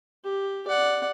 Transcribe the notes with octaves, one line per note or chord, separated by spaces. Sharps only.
G4
D5 F#5